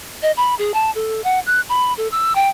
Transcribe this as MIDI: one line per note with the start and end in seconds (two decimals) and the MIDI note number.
0.22 0.32 75
0.37 0.55 83
0.59 0.72 68
0.74 0.91 81
0.95 1.21 69
1.24 1.40 78
1.46 1.61 90
1.69 1.94 83
1.97 2.08 69
2.12 2.33 88
2.35 2.49 79